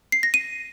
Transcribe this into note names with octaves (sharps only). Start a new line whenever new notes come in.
C7
A#6
D#7